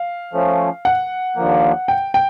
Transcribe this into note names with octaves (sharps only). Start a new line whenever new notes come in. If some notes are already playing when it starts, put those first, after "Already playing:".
Already playing: F5
F3 A3 C#4
F#5
D#2 D3 F3 A#3
G5
G5